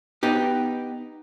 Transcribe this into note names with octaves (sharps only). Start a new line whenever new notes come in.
B3 D#4 G4